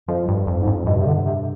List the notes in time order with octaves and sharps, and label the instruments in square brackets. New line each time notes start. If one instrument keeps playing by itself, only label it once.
[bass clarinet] F2 [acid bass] F3
[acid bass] G2
F2
[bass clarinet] G#2
[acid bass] F2
[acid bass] G2 [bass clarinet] B2
[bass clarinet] C3
D3
C3